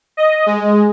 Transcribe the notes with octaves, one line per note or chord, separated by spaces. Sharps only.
D#5
G#3